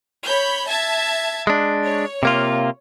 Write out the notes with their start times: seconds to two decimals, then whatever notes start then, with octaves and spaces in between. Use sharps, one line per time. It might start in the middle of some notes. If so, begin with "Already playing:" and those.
0.24 C#5 B5 G6
0.67 E5 A5 G#6
1.47 G#3 D4
1.84 C#5
2.23 C3 A#3 F4